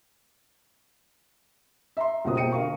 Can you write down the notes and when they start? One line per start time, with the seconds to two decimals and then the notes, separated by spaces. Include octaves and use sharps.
1.97 E5 A#5 C6
2.24 C#2 B2 A#3 F#4 C5 D#6
2.37 B2 A#3 C5 G5 C#7 D#7
2.52 D3 A#4 F5 C#6